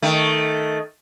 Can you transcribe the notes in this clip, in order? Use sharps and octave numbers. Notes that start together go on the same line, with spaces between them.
D#3 A3